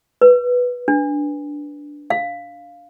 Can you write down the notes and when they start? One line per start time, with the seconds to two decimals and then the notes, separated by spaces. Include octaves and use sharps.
0.22 B4
0.88 D4
2.10 F5